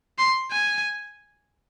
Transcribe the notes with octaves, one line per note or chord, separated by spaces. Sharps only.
C6
G#5